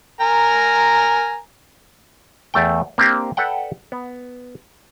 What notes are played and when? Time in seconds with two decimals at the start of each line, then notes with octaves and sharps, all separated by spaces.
0.21 A#4 G#5 A#5
2.54 E2 A3 G5
2.98 A#3 C4 D4 G4
3.37 A4 B4 D5 F#5 G5
3.92 B3